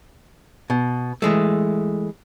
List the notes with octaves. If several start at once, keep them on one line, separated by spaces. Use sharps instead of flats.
B2
E3 G#3 A3